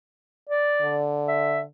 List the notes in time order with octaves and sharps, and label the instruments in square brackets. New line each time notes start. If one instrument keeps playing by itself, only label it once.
[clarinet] D5
[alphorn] D3
[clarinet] E5